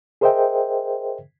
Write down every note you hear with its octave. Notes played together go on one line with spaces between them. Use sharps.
G#4 A#4 C5 D#5 E5 G5